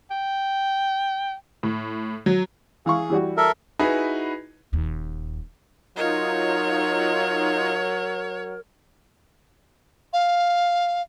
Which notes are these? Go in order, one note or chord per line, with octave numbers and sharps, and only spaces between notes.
G5
A2
F#3
E3 G#4 F5 C#6
E3 G3 F#4
A4 A#4 E5
D#4 E4 F#4 G#4 B4
D#1 D#2
F#3 D#4 F4 A#4 C#5
F5